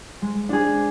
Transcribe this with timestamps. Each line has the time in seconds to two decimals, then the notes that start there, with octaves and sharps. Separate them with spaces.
0.22 G#3
0.49 D4 G#4